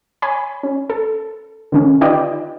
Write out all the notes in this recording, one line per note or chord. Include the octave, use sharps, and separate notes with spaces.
C#5 G#5 B5
C#4
A4
D3 D#3 C#4
D#4 F4 G4 B4 D5 D#5